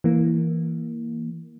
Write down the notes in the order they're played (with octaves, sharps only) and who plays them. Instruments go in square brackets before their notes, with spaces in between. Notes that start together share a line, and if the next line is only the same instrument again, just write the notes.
[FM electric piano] E3 A#3